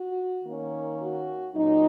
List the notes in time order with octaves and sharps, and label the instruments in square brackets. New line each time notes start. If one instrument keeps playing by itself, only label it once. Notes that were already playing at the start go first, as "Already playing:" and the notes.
Already playing: [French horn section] F#4
D#3 A#3 C#4
F#4
A#2 F#3 C#4 D#4